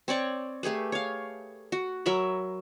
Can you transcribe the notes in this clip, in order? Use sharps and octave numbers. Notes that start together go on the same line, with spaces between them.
C4 C#5 D5 C#6
A3 G4 G#4 B4
C#5 F5
F#4
F#3 A#4 E5 B5